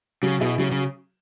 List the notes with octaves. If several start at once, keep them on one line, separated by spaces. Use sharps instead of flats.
C#3 F#3
B2 E4 G#4 E5
C#3 F#3
C#3